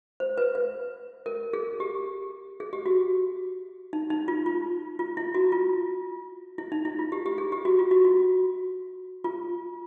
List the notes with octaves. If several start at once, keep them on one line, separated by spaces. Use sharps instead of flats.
C5
B4
B4
A#4
G#4
G4
G#4
G4
F#4
D#4
D#4
F4
F4
F4
E4
F#4
F4
E4
D#4
E4
F4
G4
G4
G#4
G4
F#4
F4
F#4
F#4
F4